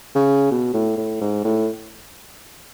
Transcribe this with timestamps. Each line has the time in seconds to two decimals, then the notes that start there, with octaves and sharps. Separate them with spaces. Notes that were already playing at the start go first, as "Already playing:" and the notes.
0.15 C#3
0.51 B2
0.74 A2
0.97 A2
1.21 G#2
1.44 A2